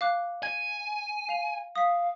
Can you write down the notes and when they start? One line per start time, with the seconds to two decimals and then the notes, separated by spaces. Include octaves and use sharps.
0.01 F5 D6 F#6
0.43 G#5 G#6
1.29 F5 F7
1.76 F5 D#6 B6